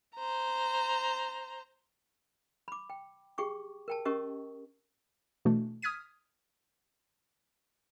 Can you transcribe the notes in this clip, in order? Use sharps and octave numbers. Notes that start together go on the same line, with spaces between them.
C5 A#5
B5 D6
G5
G4 G#4 G5 C#6 D6
A#4 G5 A5
C#4 G4 A#4 D#5 C#6 D#6
B2 E3 A3 D4
D#6 F6 G#6 B6 D#7